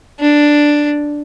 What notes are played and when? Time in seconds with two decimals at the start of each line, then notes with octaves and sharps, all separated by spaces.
0.20 D4